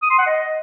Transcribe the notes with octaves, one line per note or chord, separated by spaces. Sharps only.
D#6
C6
F#5
D#5